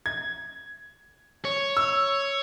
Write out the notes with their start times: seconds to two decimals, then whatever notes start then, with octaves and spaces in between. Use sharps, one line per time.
0.06 G#6
1.45 C#5
1.77 E6